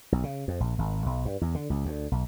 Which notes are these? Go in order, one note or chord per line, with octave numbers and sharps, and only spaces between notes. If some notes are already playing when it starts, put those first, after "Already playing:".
B1
C#3
F2
A#1
G#1
B1
G2
E2
D3
C#2
D2
B1